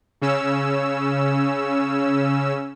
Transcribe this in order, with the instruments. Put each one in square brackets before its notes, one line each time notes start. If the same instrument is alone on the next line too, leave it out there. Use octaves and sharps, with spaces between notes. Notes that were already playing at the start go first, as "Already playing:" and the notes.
[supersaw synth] C#3 C#4 E6